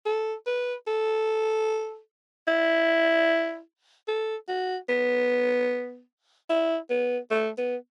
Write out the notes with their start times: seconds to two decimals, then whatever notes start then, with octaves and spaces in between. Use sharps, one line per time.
0.06 A4
0.46 B4
0.87 A4
2.48 E4
4.08 A4
4.48 F#4
4.89 B3
6.49 E4
6.90 B3
7.31 A3
7.58 B3